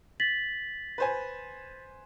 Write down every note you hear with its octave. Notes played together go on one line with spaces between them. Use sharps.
A6 B6 F#7
B4 C5 G#5